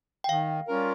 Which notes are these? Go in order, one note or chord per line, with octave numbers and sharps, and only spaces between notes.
G5
D#3 F5
G3 C#4 F4 A#4